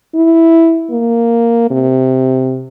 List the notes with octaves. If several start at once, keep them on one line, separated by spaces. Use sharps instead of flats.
E4
A#3
C3